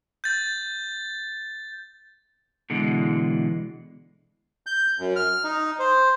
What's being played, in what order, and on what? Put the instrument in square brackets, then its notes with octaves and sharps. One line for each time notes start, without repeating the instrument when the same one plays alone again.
[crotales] G6 A6
[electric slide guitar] B2 D3 E3 G#3
[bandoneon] G6
F#2
F6
D#4
C5